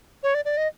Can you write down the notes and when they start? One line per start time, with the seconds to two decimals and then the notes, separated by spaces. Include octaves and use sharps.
0.23 C#5
0.34 D5
0.45 D5
0.57 D#5